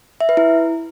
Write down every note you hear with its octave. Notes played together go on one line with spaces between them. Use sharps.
E5
B4
E4